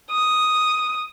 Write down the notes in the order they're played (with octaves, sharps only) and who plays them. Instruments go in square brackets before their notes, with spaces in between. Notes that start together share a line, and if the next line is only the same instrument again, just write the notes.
[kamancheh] D#6